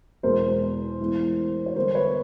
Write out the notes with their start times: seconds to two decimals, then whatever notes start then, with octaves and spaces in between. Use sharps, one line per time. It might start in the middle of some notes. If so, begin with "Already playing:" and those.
0.23 E2 B2 G#3 A#4 C5
1.00 A2 E3 G#3
1.66 C#5
1.76 D3 G3 B3 A#4 C5
1.95 B4 C#5